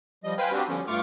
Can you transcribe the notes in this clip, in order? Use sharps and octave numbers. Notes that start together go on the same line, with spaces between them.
F3 G3 D#5
B4 C5 F5 G5 G#5 B5
C4 D4 F#4 G4
D3 F3 G3 B3 C#4
G2 A3 F4 C#6 D6 F6